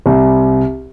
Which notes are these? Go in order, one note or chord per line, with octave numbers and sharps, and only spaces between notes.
C2